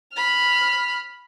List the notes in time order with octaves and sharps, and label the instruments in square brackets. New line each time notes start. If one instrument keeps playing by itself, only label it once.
[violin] B5 F6